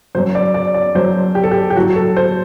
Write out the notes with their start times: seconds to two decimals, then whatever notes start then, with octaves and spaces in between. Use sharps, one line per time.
0.15 F#2 F#3 C5
0.35 D5
0.54 D5
0.74 D5
0.95 F#2 F#3 C5
1.35 G4
1.44 A4
1.51 G4
1.70 G4
1.76 A2 F#3 F#4
1.96 A4
2.17 C5